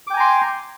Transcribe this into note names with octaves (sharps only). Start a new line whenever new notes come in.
G5 G#5 A#5 C6 D6